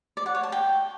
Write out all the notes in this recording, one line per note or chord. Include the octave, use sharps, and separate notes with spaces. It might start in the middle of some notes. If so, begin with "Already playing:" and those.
D5
F#5
C#5
A5
G5